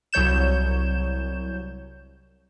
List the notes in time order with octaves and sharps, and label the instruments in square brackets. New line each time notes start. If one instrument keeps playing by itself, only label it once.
[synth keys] C2 F#3 C#5 G6 E7